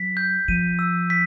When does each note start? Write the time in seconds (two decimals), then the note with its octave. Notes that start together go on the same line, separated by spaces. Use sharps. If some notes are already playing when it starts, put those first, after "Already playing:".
Already playing: F#3 B6
0.17 G6
0.48 F3 D#7
0.79 E6
1.10 B6